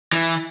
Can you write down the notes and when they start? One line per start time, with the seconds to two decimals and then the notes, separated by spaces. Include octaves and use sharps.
0.13 E3